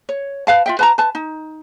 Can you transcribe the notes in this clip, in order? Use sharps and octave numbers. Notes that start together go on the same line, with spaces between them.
C#5
B4 F5 A5
F4 E5 G5
B4 A5 A#5
B4 A5
D#4